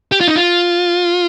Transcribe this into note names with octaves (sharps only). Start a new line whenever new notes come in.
G4
F4
D#4
F4